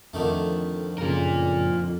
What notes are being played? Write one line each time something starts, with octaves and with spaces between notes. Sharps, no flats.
F2 D3 D#3 A3
F#2 C#3 F4 A#4